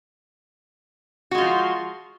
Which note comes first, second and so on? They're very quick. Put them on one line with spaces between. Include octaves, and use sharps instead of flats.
F#4 G#3 F4 F3